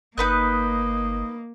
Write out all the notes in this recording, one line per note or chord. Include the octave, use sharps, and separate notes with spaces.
G1 A#3 D#4 B4 D#5 F#6